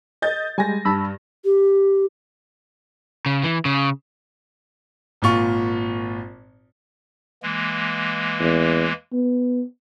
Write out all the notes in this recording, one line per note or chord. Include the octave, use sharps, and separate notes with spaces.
D#5 G6 A6
G3 G#3 G#5 A#6
G2 A5 B5 E6
G4
C#3
E3
C#3
G#1 A#2 F4 C#6
E3 G#3 A#3
E2
B3